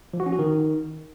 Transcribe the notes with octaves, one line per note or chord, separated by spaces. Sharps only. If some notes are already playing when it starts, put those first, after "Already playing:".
F3
F#4
C#4
F#4
D#3